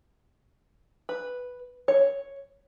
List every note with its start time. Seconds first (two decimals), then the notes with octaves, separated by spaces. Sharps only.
1.09 B4
1.88 C#5